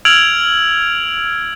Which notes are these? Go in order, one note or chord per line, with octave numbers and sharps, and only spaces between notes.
E6 F6 G#6 D7 F7 F#7